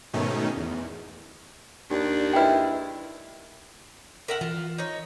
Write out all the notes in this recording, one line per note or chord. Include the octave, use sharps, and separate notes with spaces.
G#2 B2 D#3 A3 C#4 D#4
E2
D#2 D4
G#3 E4 B4 G5
A#4 E5 F#5
E3 F4
D#4 C#5